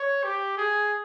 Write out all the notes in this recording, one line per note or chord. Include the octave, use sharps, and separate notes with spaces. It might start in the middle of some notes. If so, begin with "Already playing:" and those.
Already playing: C#5
G4
G#4